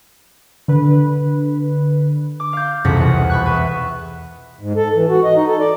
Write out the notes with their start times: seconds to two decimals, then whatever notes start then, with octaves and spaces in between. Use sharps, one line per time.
0.68 D3 B4
2.40 D6
2.53 F5 G6
2.84 E1 C2 F2 C3 F#5 B6
2.97 E2 F#5
3.30 B5 C#6 F#6
3.46 B4 E5
4.61 G#2
4.76 A4
4.95 E3
5.10 F#4
5.24 D#5
5.36 D#4
5.48 A4
5.59 D5